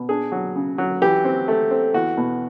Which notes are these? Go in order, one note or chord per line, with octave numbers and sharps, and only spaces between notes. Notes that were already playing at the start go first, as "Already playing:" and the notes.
Already playing: B2
D4 G#4
F#3
C#3
F#3
E3 G4
C4
A3
C4
E2 F#4
B2